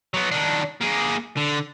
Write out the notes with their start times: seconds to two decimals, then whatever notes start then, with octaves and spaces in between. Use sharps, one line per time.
0.14 F#3 B3
0.32 D#3 D4
0.81 A#3 G#4
1.37 D3